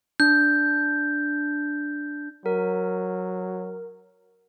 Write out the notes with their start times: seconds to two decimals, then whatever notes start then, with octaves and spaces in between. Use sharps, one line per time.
0.20 D4 G6
2.46 F#3 A#4